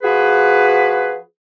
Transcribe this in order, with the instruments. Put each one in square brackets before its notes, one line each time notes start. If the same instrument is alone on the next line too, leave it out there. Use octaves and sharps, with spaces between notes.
[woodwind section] F3 F#4 G#4 B4